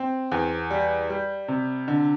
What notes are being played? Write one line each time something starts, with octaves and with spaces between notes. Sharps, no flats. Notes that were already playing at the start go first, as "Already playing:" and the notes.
Already playing: C4
E2
G3
G3
C3
D3